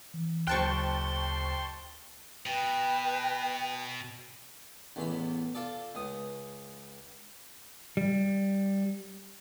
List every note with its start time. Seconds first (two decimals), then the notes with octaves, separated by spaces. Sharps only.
0.14 E3
0.47 F#1 D2 C5 G5 A5 C6 C#6 F#6
2.46 B2 B4 G5
4.96 A1 E2 E3 B5
5.55 F4 A4 D5
5.95 C#2 D#6
7.97 G3